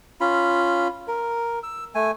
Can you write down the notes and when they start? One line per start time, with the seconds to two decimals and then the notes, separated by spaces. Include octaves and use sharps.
0.21 C#4 F4 B5
1.08 A#4
1.63 E6
1.95 A3 G#5